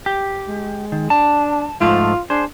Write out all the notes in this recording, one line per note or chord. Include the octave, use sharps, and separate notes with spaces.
G4
G#3
D#3
D4 A5
G#2 F3 A3 F4
D4 G#4 C5